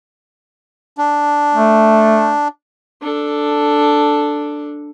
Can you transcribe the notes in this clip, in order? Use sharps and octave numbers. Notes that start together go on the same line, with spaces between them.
D4
A3
D4 A4